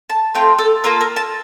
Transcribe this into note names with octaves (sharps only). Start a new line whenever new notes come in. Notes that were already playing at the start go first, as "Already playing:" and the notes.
A5
A3 C4 F4 G5
A4
A#3 F4 A4 A#4
A#4
A5